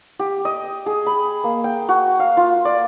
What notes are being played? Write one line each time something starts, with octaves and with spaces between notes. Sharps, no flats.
G4
D#5
G#4
B5
A#3
G5
F#4
F5
F4
D5